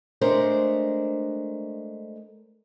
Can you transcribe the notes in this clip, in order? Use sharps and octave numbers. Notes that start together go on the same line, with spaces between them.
G#3 A3 D4 A#4 C5